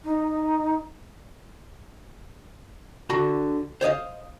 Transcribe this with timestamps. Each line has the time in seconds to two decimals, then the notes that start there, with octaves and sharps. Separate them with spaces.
0.04 D#4
3.10 D3 D4 F#4 B5
3.81 C5 C#5 D#5 F5